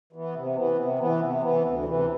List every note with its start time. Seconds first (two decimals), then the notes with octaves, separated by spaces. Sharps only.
0.13 E3 B3
0.35 C3
0.56 E3 B3
0.78 C3
0.99 E3 B3
1.20 C3
1.41 E3 B3
1.64 D2
1.85 C3 E3